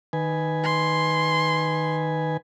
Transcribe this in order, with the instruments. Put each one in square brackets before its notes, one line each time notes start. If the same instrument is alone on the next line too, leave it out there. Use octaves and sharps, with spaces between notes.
[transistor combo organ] D#3 B4 G#5
[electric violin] C6